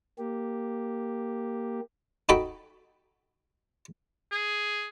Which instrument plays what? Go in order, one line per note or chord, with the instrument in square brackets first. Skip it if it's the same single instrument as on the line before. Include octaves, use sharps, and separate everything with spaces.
[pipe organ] A#3 G4
[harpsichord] D#4 F#4 A4 G5 B5
[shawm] G#4